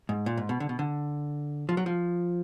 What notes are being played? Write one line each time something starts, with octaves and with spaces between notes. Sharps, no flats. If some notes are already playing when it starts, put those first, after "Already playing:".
G#2
A#2
G#2
B2
D3
B2
D3
F3
F#3
F3